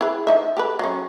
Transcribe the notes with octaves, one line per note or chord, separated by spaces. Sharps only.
E4 G#4 B4
F3 D#4 E5
G4 A4 B4
F#3 C#4